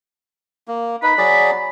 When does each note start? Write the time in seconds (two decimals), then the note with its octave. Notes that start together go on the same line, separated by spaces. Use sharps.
0.68 A#3
1.03 D#4 B4 B5
1.18 F#3 G#4 D5